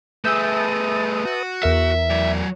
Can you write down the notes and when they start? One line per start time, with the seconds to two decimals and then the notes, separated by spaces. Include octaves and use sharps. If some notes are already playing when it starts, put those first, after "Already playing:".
0.25 A3 G#4 B4 E5 A5 D#6 E6 G6
1.25 F#4
1.63 E2 A#4 E5
2.10 F#3 D5 G#5